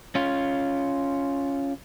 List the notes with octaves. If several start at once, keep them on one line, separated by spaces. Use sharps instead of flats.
C#4 F4